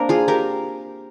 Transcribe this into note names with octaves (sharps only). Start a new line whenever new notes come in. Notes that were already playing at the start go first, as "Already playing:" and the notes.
Already playing: A#3 C4 D4 A#4
F4 G#4
G4 A#4